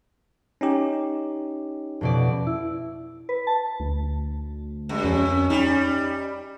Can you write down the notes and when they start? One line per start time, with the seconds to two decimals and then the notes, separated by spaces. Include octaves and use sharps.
0.61 C#4 D#4 G4
2.01 F2 B2 D5
2.47 E4
3.29 B4
3.47 A5
3.80 D2
4.89 F#2 G#3
5.04 F2 C#4
5.50 G3 D#4